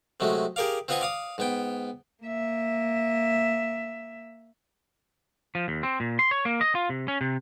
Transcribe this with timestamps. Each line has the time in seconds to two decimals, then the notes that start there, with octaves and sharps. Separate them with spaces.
0.20 C3 F#3 G#3 A3
0.56 G4 G#4 A#4 D5 F5
0.88 C4 F4 B4 D#5 F#5 G#5
1.01 D5 F5 D#6
1.38 G#2 B3 G5
2.23 A#3 E5
5.55 F3
5.68 D#2
5.83 C4
6.00 A#2
6.19 C6
6.31 C#5
6.45 A#3
6.61 D#5
6.75 F4
6.89 C3
7.08 C#4
7.21 C3